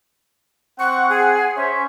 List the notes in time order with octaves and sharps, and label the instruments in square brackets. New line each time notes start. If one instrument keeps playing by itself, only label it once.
[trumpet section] C4 F#5 [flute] C#6
[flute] G#4
[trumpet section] C#4 C5 C#5 [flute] E5